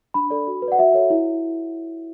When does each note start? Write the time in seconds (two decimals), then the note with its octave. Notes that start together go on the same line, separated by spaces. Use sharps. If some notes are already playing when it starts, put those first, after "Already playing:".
0.14 D4 B5
0.30 A4 D5
0.47 F#4
0.62 B4
0.68 D5 F#5
0.78 F#4 E5
0.94 A4 C#5
1.10 E4